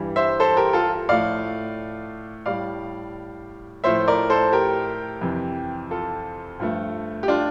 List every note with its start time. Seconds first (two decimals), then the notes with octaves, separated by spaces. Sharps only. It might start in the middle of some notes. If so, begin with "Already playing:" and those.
Already playing: G2 E3 G3
0.16 C5 E5
0.40 A4 C5
0.57 G4 A#4
0.73 F4 A4
1.08 A2 F3 A3 D5 F5
2.46 A2 G3 D5 F5
3.84 A2 F3 A3 C5 E5
4.08 A#4 D5
4.30 A4 C5
4.53 G4 A#4
5.21 F2 C3 E3
5.91 F4 A4
6.60 G2 F3 A3
7.23 G4
7.28 D4 F4